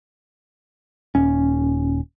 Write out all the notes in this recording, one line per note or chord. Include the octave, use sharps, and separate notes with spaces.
D#1 C#4